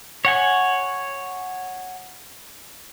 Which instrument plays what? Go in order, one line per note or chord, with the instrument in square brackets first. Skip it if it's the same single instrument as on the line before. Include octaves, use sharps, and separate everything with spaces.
[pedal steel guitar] C#5 F#5 G#5